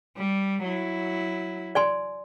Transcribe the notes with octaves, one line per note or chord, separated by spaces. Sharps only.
G3
F#3 E4
D5 G#5 C6